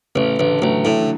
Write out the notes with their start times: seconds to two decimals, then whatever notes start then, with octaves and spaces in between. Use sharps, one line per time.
0.15 A1 C#3
0.39 A1 D3
0.62 A1 F#3
0.84 A2 E3
1.02 D3